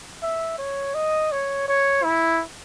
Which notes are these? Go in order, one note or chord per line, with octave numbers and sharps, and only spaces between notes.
E5
C#5
D#5
C#5
C#5
E4